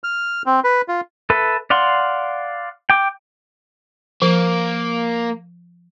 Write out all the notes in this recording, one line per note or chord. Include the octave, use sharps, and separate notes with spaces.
F6
C4
B4
F4
A4 B4 E5
D5 F5 F#5 C6
G5 D6
F3 A#3